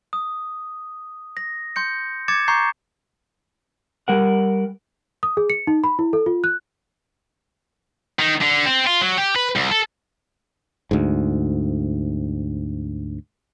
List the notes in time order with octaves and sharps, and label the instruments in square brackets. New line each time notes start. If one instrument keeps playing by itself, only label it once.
[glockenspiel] D#6
A#6
C6 G6 C#7
D6 G#6 A6 C#7 E7
A#5 C#6 D6 G6 C7
[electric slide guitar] G3 A#4 F#5
[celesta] D#6
G#4
C#7
D#4
B5
E4
A4
F4
F#6
[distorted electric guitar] D#3
D3
C4
F4
F#3
G4
B4
C2
A4
[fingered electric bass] D2 G#2